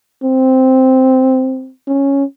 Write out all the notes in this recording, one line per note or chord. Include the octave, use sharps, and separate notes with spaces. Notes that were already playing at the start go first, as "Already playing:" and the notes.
C4
C#4